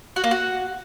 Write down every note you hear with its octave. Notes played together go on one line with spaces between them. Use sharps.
F#4
A#3
F#4